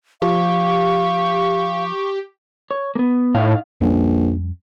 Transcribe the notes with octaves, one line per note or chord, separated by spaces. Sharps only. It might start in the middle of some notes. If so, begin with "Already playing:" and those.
F3 G4 F5 C#6
C#5
A#3 B3
A2 D#4 F5
A#1 F2 G3 C#4